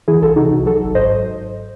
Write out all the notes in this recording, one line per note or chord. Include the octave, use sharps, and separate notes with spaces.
E3 E4 G#4
C2 F#4 A4
C3 D#4 F#4
C2
F#3 F#4 A4
G#1
G#2 C5 D#5